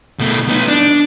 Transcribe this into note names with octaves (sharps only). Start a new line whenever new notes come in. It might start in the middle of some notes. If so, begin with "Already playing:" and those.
B2 A3
B3 D#4
D4